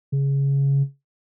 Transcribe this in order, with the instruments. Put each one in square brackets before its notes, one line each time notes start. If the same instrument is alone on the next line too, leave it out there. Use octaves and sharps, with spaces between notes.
[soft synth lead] C#3